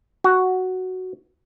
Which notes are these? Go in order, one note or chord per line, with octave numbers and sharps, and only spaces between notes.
F#4